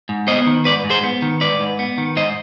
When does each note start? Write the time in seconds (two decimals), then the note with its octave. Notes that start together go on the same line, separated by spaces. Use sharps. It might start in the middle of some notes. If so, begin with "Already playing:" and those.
0.09 G#2
0.28 B3 C5 D#5
0.46 D#3
0.65 G#2 B4 D5
0.85 G#2
0.90 G#4 C5
1.04 B3
1.22 D#3
1.41 G#2 B4 D5
1.60 G#2
1.79 B3
1.98 D#3
2.16 G#2 C5 D#5